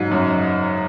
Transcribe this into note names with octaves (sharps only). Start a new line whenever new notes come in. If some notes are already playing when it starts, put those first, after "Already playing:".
Already playing: G#2 C#3 F#3
F#2